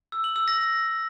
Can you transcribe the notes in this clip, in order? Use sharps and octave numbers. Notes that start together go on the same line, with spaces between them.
E6
F#7
E6
A#6